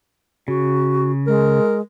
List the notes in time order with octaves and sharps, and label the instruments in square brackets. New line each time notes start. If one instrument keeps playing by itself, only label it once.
[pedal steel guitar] C#3 [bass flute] F#4
[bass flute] G#3 [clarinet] A#4